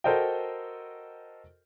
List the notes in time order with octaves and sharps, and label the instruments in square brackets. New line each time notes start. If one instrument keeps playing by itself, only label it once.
[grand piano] F#4 A4 A#4 C5 D#5 G5